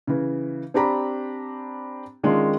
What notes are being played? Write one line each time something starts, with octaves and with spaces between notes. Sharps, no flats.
C#3 E3
C4 D4 G4 A#5 B5
D#3 G#3 C#4 D4 F4